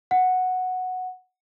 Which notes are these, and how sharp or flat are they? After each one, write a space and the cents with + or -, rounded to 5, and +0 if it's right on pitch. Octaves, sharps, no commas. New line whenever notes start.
F#5 -5